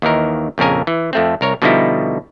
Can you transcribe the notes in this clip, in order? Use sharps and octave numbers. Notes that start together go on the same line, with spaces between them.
D#2 D#3 E3 A#4
A#1 F2 C#3 A#4 G#5
E3
F2 A3 C4
C2 A#4 C#5
B2 D3 F3 G3 D#4 E4